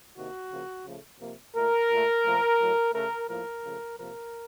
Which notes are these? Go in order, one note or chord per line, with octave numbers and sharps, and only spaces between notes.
C3 D#3 A#3 F#4
C#3 F3 A#3
C#3 F3 A3
C3 F3 A#3
A#2 A3 A#4
A#2 A3
A#2 F3 A3
A2 F#3 A3
C#3 A3 A#4
A2 F3 A#3 A#4
C#3 F3 A3
C3 F3 A#3 A#4